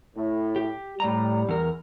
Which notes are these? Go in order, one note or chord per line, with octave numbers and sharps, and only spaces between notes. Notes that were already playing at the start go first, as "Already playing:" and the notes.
A2
G4
A2 G3 A#5
E2 A#4